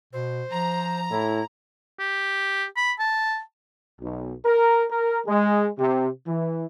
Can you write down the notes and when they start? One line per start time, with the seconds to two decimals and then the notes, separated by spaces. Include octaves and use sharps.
0.13 B2 C5
0.51 F3 A#5
1.10 A2 E4
1.99 G4
2.76 B5
2.99 A5
4.01 B1
4.45 A#4
4.91 A#4
5.27 G#3
5.78 C3
6.26 E3